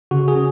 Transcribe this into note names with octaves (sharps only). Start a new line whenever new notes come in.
C#3 F#4
G#4
C#4